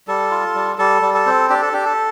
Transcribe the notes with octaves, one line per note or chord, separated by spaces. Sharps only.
G3 A4
F4
G3
G3 A4
G3
A4
C4
D4 G4
A4
D4 G4
A4